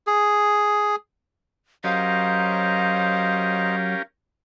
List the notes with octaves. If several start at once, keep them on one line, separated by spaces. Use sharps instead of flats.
G#4
F#3 C#4 G4 A#4 C5 D#5 F5 A#5